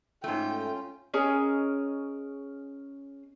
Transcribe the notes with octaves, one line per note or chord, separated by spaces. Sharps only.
G#2 A3 C#4 F4 G5
C#4 G#4 A#4 D#5